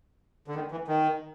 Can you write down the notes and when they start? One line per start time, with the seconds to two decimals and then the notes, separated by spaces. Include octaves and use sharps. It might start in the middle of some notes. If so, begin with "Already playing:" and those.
0.48 D3
0.55 D#3
0.71 E3
0.88 D#3